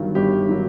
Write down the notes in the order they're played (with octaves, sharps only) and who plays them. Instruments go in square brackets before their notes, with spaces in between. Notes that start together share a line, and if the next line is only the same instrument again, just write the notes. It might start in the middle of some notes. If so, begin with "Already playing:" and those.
Already playing: [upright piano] G1 G2 D#3 F#3
G1 G4
D#3 F#3